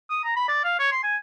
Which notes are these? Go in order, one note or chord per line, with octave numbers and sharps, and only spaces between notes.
D#6
A#5
B5
D5
F5
C#5
C6
G#5